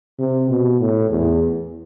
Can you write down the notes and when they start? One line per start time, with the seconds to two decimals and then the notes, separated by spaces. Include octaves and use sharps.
0.19 C3
0.50 B2
0.80 A2
1.10 E2